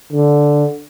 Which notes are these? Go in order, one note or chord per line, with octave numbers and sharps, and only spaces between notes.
D3